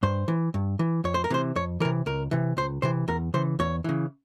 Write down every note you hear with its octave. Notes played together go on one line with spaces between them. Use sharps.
G2 C5
E3
G2
E3
F2 C#5
C5
A#4
C3 E3 C5
F2 C#5
C3 E3 A#4
C#2 A#4
C3 E3
C#2 C5
C3 E3 C5
E2 A#4
C#3 E3 C5
E2 C#5
C#3 E3